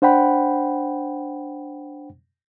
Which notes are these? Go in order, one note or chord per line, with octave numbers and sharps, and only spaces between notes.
D4 C5 F#5 G5 B5